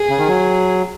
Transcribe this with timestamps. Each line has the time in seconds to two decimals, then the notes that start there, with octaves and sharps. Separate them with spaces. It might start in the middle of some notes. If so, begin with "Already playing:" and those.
Already playing: G#4
0.09 C#3
0.18 D#3
0.28 F#3